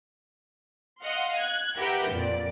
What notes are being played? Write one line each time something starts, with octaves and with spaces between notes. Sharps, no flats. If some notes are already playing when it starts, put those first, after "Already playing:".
D#5 F5 F#5 C6
F#6 G#6
G4 A#4 B4 E5 F#5 G5
F2 A#2 D5